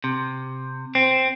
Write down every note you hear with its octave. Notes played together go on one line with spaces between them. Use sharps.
C3
C4